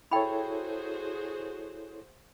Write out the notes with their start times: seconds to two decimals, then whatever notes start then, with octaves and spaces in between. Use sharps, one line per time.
0.11 E4 F#4 G#4 A4 C5 C#5 G5 B5